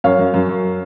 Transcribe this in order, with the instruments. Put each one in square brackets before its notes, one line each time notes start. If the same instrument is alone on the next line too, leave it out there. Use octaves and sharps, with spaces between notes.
[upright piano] F#2 C#5 F5
F#2
F#2
F#2